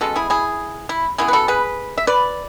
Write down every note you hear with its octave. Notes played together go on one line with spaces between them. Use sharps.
B2 G#3 C#4 F#4 A4
E4 G#4
E4 G#4
E4
C#3 E3 B3 E4 G#4
B4
F#4 A4
G#4 B4
E5
B4 D5